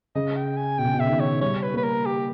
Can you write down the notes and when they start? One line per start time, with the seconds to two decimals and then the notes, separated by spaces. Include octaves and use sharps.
0.15 C#3 D#5
0.36 G5
0.57 G#5
0.79 B2 G5
0.86 C#3
0.94 B2
1.00 C#3 E5
1.10 D#3
1.20 C#5
1.42 G3 C#5
1.63 B4
1.74 A#3 B4
1.84 A#4
2.06 G4